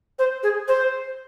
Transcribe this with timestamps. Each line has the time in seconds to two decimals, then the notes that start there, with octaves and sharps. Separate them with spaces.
0.19 C5
0.43 G#4
0.68 C5